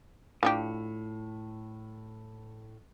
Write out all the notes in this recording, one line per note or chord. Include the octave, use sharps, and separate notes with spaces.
A2 F3 D4 G4